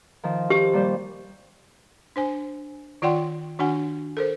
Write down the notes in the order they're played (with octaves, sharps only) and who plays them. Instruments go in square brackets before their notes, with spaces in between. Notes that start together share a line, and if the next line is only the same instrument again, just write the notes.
[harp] D#3 F3
[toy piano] G4 [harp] C5
[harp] A#2 G3 C5
[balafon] D4 C5 G#5
D#3 F4 D5 F#5 G5 C6
D#3 D4 F#4 F#5 G#5
A4 A#4 C5